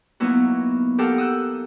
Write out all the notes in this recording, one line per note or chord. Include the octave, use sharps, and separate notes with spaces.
F#3 A#3 B3 D#4 E4 F#4
G4 A4 A#4 F5 F#5
D#6 E6 F#6 G6